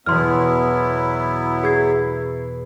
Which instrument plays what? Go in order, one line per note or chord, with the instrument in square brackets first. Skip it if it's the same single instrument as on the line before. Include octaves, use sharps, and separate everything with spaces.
[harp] E2 B2 [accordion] F#3 B3 E4 [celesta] C6 F6
[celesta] G#4 G#6 C7